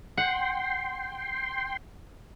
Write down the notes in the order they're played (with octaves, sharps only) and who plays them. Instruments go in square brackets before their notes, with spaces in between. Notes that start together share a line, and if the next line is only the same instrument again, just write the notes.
[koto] F#5 [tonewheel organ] G5 C6